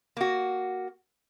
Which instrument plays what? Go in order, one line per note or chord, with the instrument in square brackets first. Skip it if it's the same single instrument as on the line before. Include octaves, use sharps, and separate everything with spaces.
[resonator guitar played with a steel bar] A#3 F#4